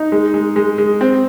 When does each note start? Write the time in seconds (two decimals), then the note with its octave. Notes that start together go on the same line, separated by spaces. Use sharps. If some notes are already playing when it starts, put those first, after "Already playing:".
Already playing: D#4
0.12 G#3
0.34 G#3
0.56 G#3
0.78 G#3
1.01 C4